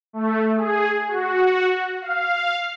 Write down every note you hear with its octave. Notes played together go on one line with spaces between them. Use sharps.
A3
G#4
F#4
F5